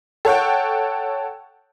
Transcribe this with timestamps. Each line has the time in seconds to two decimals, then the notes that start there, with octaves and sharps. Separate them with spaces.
0.25 A4 C#5 F#5 G5